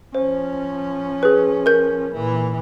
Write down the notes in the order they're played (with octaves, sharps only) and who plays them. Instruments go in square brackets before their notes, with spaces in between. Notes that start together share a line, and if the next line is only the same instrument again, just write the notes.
[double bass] F3 C#4 [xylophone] C5
[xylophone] G#4 B4
A#4 G6
[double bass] A#2 E3